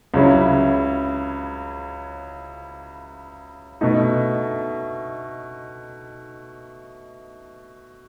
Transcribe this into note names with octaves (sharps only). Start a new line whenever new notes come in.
C#2 C#3 F#3 C#4 E4
B2 A3 D#4